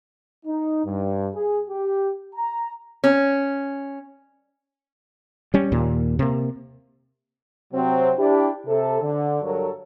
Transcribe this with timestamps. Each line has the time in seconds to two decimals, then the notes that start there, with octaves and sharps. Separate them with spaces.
0.46 D#4
0.85 G2
1.36 G#4
1.68 G4
2.34 A#5
3.04 C#4
5.54 G3 C#4
5.72 D#2 A#2
6.19 C3 A#3
7.73 C3 F#3 C4
8.18 D4 E4 G4
8.67 C3 A4
9.02 D3
9.43 G2 F#3 F#4 A4 A#4 C#5